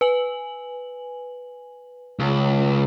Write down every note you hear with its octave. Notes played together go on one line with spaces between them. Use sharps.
B4 G#5 F#7
C#2